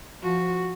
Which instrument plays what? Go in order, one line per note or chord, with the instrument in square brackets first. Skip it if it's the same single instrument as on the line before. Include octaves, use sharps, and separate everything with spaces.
[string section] F3 [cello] F#4